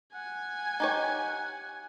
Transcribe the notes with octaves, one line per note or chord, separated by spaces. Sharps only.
F#5 G#5
D#4 G4 C#5